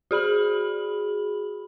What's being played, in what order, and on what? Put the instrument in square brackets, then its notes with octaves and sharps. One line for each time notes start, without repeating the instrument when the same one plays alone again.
[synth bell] F#4 G#4 B5 F#7